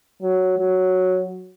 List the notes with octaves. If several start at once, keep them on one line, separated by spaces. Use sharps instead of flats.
F#3
F#3